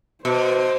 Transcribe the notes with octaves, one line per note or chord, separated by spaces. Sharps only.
B2 C5